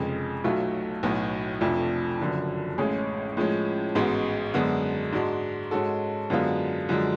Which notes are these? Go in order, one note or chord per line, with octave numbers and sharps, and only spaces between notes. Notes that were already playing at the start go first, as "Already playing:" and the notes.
Already playing: F1 F2 C#3 G#3
B1 B2 F#3 A3 F4
B1 A2 F#3 B3
F1 F2 F3 A3 D4
F#1 F#2 D3 F3
A1 A2 G#3 C#4 G#4
A2 F3 G#3 C#4
A1 G#2 G#3 B3 F#4
F#2 D3 G#3 B3 F#4
G#2 G#3 D4 F#4
G#2 G#3 C#4 F#4 A4
F#2 D3 G#3 B3 F4
F#2 D3 F3 G#3